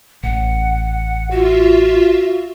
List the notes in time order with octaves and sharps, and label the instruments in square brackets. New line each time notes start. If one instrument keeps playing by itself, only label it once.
[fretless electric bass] A1 [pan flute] F#5
[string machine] F4 E5 [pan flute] F#4